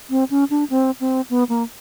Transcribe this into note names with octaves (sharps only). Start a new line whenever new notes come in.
C4
C#4
D4
C4
C4
B3
A#3